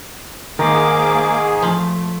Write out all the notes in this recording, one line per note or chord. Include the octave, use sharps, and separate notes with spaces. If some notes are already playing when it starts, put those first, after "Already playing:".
G#2 D#3 A#3 G#4 A#5 D6
F3 A3